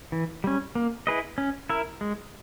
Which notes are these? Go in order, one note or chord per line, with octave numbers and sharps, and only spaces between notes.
E3
G3 C#4
A#3
E4 G#4 B4 D#5
C#4
E4 A#4 E5
G#3